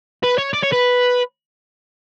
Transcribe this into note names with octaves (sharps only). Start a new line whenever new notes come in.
B4
C#5
D5
C#5
B4